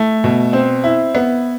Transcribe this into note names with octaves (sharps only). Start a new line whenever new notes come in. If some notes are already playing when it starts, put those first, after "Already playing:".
Already playing: A3 E4
B2
C4
E4
B3